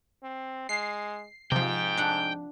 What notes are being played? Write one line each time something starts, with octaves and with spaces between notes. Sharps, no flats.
C4
G#3 C7
G#2 C3 F3 G5
D4 F#5